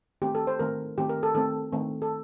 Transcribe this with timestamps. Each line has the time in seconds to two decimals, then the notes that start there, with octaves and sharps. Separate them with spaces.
0.22 D#3 A3 C4 G4
0.35 A4
0.47 C5
0.59 D#3 A3 C4 A#4
0.98 D#3 A3 C4 G4
1.09 A#4
1.23 A4
1.35 D#3 A3 C4 A4
1.73 D#3 A3 C4
2.02 A4